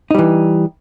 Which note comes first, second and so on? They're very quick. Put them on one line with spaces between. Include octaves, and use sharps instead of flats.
D#4 G3 E3